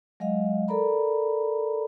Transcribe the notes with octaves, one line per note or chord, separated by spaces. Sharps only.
F#3 G#3 D#5 F5
A4 A#4 D5 A#5 B5